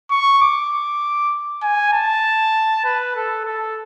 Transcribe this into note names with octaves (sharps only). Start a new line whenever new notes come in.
C#6
D6
G#5
A5
B4
A4
A4